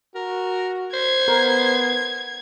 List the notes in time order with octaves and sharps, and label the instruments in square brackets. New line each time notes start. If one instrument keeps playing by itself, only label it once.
[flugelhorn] F#4 [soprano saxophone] A#4
[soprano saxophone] C5 [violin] G#6
[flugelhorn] B3 [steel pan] A#4